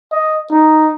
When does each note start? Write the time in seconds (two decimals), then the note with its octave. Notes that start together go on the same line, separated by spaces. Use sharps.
0.12 D#5
0.52 D#4